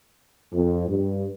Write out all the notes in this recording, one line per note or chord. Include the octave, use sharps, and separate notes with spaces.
F2
G2